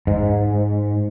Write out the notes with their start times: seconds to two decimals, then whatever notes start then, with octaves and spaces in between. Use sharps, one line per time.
0.07 G#2